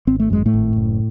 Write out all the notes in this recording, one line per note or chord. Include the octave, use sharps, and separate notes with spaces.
G#1 C4
A3
F#2 G#3
A2 A3
G#1
F#1